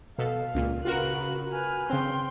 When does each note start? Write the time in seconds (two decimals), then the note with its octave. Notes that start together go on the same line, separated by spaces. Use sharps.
0.18 B2 A4 F5
0.55 C#2 A#2
0.85 C#3 F4 F#4 A#4 B4 F#6
1.50 B4 G#5 F6
1.90 C#3 C4 G5 C6